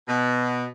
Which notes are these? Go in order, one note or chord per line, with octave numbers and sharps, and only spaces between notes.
B2